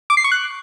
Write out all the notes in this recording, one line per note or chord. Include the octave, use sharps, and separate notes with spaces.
D6
C7
C#6
F#6